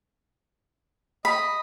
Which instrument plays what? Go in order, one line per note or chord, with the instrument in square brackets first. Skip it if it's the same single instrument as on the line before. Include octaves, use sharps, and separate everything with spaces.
[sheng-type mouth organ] D#5 [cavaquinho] B5